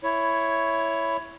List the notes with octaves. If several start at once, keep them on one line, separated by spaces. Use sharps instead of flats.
E4 C#5